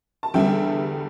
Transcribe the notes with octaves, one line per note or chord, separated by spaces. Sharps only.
A5
E2 D3 G3 B3 D4 E5 G5